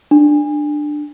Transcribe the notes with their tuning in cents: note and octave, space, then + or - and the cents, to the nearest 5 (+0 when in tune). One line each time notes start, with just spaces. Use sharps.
D4 +15